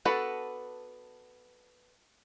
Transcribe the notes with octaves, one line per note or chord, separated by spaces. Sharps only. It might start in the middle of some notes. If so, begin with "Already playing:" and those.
B3 D4 F#4 A4 B4